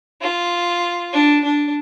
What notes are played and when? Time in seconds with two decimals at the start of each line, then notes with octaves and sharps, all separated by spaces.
0.22 F4
1.13 D4
1.44 D4